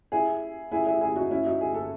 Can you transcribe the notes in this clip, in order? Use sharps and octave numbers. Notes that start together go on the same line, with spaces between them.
E4 G#4
E4 G#4
E4 G#4
E4 G#4
D#4 F#4
C#4 E4
D#4 F#4
G#4
A4